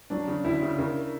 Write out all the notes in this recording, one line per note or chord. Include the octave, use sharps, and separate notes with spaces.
F#3 D4
C#3
D2 E4
C#3
C#3 A#4